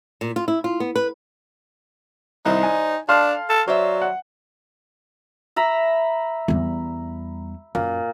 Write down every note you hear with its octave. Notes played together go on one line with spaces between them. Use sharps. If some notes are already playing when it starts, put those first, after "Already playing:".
A#2
F4
E4
F4
B3
B4
C2 G3 D#4 C5
G#5
D4 A4 F5 C6 F6
A4
F#3 C5 D5 E5
F#5
E5 A#5 B5
E2 G3
F#2 A#2